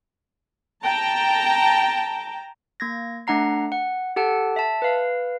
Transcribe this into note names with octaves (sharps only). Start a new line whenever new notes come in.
G5 A5 A#5
A#3 G#6 A#6
A3 D4 F#5 A#5 C7
F#5
G4 A4 F#5 A5
E5 A5
B4 F5